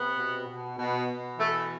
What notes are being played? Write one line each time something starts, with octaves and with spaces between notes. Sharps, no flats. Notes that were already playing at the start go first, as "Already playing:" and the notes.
Already playing: C3 B3
B2
B2
B2
B2
E3 A3